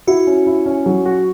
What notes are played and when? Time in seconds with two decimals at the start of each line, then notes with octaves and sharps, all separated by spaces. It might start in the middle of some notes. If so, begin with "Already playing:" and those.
0.07 E4 F#4
0.27 C#4
0.46 E4
0.66 C#4
0.86 F#3
1.06 F#4